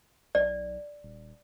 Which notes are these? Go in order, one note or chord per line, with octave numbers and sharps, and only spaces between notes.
B1 D5
D#1